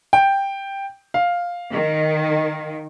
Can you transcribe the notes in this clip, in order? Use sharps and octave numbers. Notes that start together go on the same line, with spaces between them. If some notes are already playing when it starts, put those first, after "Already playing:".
G5
F5
D#3